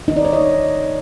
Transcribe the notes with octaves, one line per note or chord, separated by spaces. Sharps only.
D#4
D5
C#5
D#5